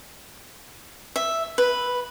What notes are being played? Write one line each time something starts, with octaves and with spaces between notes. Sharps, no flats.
E5
B4